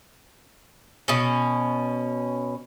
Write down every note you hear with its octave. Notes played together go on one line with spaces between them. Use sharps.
B2 C#4